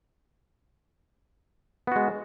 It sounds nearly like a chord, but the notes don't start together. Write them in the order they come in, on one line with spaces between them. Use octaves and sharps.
B3 F#4 G#3